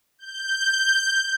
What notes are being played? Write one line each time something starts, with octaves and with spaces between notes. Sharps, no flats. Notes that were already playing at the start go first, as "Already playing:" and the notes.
G6